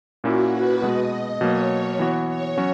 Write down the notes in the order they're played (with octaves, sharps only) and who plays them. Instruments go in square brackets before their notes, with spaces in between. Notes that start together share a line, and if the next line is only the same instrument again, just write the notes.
[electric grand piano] A#2 A#3 C#4 E4 [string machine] F#4
[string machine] B4
[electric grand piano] B2 G#3 B3 [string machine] D#5
[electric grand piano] B2 F#3 A#3 [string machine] C#5
[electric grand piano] E3 B3 F#4
[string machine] C#5
[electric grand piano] F#3 C#4 F#4